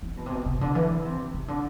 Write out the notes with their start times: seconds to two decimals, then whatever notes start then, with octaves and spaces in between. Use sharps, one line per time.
0.03 E3
0.17 B2
0.26 C3
0.32 B2
0.46 C3
0.61 D3
0.75 E3
0.90 E3
1.05 C3
1.34 C3
1.48 D3